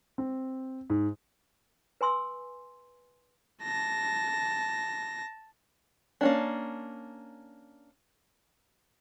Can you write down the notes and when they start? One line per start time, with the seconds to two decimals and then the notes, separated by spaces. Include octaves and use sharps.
0.18 C4
0.90 G#2
2.01 B4 G#5 C6 E6
3.64 A5 A#6
6.21 A#3 C#4 D4